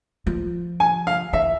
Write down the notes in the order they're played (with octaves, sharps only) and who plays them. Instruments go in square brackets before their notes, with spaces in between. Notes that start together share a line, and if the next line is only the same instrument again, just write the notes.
[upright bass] F3
[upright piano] G#5
F5
[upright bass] E3 [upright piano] E5